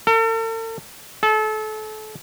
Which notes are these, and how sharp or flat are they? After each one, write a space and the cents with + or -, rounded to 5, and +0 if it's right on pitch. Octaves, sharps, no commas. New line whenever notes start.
A4 +45
A4 -30